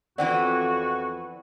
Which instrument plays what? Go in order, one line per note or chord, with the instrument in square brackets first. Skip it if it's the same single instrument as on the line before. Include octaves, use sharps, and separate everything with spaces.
[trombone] F2 [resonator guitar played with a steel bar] E3 B3 C4 [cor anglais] F#4 [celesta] D5 F#5